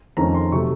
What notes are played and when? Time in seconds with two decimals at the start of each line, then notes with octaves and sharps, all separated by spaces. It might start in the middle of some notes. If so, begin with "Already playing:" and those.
0.17 F2 D#3 A3 C#4 A#5
0.34 C6
0.52 C3 F#3 A3 C#6